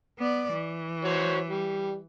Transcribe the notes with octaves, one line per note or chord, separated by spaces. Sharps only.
B3 D5
E3
F#4 C5 C#5
G3